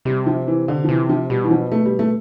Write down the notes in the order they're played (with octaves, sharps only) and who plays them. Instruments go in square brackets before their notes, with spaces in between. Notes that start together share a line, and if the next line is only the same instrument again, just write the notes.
[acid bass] C3 [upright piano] G3
[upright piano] F3
E3
D3
F3
[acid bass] C3 [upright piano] E3
[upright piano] F3
[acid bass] B2 [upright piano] G3
[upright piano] E3
F3
A3
G3
A3